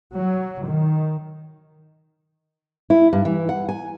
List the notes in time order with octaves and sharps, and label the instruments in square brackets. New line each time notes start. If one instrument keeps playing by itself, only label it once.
[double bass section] F#3
D#3
[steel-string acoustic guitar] E4
G2
E3
F#5
G#5